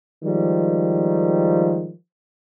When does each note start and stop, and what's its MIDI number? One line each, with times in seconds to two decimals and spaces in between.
0.25 1.92 51
0.25 1.92 53
0.25 1.92 55
0.25 1.92 56